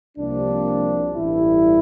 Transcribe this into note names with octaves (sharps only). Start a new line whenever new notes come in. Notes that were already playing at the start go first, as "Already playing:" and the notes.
C2 C3 F3 A#3 D4
A1 G2 E3 E4